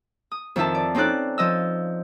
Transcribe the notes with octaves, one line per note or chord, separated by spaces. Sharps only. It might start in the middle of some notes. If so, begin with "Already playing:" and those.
D#6
F2 D#3 E4 E5 A5
D5
C4 C#4 D#4 A4 D5 F#6
F3 D#5 E6